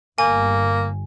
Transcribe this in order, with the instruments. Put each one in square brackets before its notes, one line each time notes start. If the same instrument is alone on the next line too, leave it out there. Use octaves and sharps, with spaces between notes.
[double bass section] G1 [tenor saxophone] A#3 [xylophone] G#5